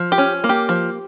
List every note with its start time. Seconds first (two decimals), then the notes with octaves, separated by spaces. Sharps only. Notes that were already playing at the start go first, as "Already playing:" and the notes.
Already playing: F3
0.12 G4
0.18 C#4
0.44 A#3
0.49 G4
0.69 F3